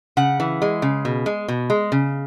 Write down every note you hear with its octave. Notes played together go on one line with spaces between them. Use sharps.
C#3 F#5
E3
G#3
C#3
B2
G#3
B2
G#3
C#3